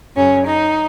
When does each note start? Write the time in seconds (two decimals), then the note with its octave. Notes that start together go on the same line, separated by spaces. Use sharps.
0.16 F#2 C#3 F#3 C#4
0.45 D#4